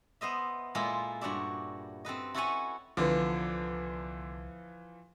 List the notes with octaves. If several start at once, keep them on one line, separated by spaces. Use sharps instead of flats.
B3 C5 D#5 E5
A#2 G#3 E4 F4 A4
G2 F#4 C#5 D5 E5
C4 A4 B4 D#5
E4 F#4 A4 B4 C#5 G#5
C2 D3 E3 F3 B3